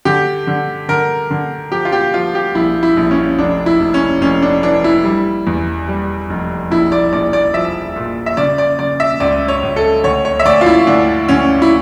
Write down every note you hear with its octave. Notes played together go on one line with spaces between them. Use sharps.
D3 G4
D3
D3 A#4
D3
F3 G4
F4
G4
F3 F4
G4
A#1 E4
E4
A#1
C#4
F1 D4
E4
F1
C#4
F1 C#4
D4
E3 D4
E4
G3
E2
G3
F1
A#1 E4
D5
A#1 D5
D5
F3 E5
A#2
E5
C#3 D5
D5
C#3 D5
E5
C#2 D5
C#5
C#2
A4
D2 C#5
C#5
E5
D2 D5
F4
E4
D2 D4
D2 C#4
E4